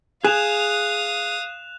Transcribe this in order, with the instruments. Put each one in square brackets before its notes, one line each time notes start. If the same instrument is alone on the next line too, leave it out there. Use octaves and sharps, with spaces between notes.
[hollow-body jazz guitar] G#4 [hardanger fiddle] F5 D#6 [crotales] F#6 E7 F7